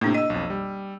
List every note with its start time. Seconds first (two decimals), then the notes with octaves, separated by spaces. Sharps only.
0.01 A2 C3 A#3 D4
0.14 D#5 E6 D#7
0.30 B1 F2
0.50 G3